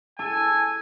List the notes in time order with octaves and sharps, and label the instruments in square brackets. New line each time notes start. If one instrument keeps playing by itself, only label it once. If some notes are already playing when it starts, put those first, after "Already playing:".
[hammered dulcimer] A4 [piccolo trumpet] G#5